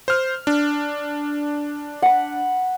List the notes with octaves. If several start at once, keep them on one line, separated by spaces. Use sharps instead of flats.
C5 F6
D4
F#5 B5